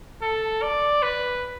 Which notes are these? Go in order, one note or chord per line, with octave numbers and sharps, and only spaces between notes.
A4
D5
B4